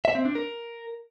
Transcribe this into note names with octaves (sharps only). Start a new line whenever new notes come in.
E5
C4
D4
A#4